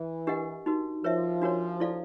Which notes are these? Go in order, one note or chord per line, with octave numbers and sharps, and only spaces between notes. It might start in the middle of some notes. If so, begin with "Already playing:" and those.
Already playing: E3
D4 G4 A#4 D#5 F#5
D#4 F#4 A#4
F3 A#4 C#5 E5
D4 F#4 A#4 C#5
E4 A4 D5 F5